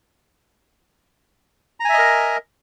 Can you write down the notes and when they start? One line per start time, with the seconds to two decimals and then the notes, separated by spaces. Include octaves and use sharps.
1.80 A#5
1.85 G#5
1.89 E5
1.94 D#5
1.99 A#4